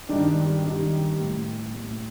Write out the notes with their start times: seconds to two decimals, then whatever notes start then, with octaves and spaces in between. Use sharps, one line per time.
0.09 G2 D#3 D4
0.47 G4
0.64 G2 D#3 G4
1.20 A2
1.74 A2